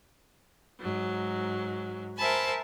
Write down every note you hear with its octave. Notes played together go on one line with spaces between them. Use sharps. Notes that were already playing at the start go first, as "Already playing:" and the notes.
G#2 F#3
A#4 C5 E5 G#5 A5 B5